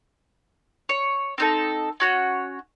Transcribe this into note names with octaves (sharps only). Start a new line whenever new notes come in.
C#5
C4 D#4 A4
C#4 F#4 C#5